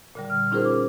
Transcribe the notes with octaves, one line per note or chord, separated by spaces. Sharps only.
A#2 D3 G3
F6
C#4 D#4 F4 G#4 A#4 C5
D6